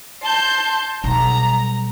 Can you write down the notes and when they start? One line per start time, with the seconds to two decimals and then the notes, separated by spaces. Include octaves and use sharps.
0.23 A5 C6 G6
1.04 B1 G3 A#5